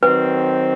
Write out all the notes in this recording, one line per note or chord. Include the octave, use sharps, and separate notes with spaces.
D#3 F#3 C4 B4